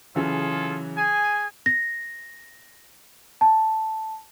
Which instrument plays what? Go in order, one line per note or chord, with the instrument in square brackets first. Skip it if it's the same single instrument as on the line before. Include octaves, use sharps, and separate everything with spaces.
[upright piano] C#3 E3 F#3 [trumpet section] F4 G#4 A4
[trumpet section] G#4 G#5
[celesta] A#6
A5